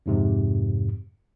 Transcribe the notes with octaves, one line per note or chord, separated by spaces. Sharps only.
F2 G#2 C3